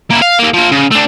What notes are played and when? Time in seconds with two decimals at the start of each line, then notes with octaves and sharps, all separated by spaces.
0.10 A#3 E4
0.22 F5
0.39 D#2 A#3
0.53 F3 A#3
0.72 C#3
0.91 A3 D4